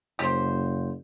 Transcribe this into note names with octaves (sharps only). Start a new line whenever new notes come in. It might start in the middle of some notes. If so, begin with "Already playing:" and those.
F#1 G4 C5